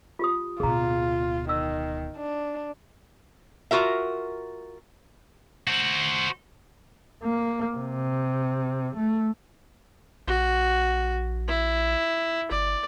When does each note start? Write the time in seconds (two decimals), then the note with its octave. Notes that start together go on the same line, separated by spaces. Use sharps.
0.19 F4 G4 D#6
0.60 D1 B2 F4 G#4 A#5
1.49 D#3 E6
2.17 D4
3.71 F4 F#4 A#4 E5
5.68 F#4 C5
7.24 A#3
7.76 C3
8.96 A3
10.28 A#1 F#4
11.48 E4
12.51 G1 D5